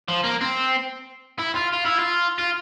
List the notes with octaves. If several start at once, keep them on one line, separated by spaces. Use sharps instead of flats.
F3
A#3
C4
E4
F4
F4
E4
F4
F4